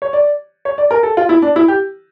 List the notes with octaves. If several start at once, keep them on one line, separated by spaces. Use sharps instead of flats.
C#5
D5
C#5
D5
A#4
A4
F4
E4
D4
E4
G4